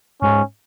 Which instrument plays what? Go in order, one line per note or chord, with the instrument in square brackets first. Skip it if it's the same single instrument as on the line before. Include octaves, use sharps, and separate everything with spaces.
[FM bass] G#2 [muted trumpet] C#4